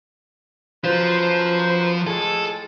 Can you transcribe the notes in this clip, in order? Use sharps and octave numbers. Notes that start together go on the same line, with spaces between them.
F#2 F3 F4 B4 C5
A2 G#3 G#4 A4